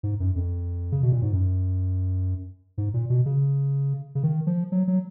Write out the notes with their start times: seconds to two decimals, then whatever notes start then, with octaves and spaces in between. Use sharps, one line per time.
0.03 G#2
0.20 F#2
0.36 F2
0.92 C#3
1.03 B2
1.12 A#2
1.22 G#2
1.33 F#2
2.78 G#2
2.94 A#2
3.10 B2
3.26 C#3
4.15 C#3
4.23 D#3
4.47 F3
4.72 F#3
4.88 F#3